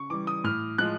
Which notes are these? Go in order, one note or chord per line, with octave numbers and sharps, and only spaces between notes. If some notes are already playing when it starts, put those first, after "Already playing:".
Already playing: C#3 C#6
E3 G3 D6
D#6
A2 F6
F3 G#3 F#6